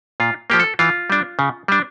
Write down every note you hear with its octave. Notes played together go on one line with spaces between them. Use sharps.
A#2 F4
F3 A#3 G4
A4
E3 F4
G3 D4
C#3
G3 D4